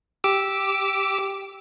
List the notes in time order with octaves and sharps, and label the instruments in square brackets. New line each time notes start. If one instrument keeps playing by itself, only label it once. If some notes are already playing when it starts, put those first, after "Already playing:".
[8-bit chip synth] G4 D6 E6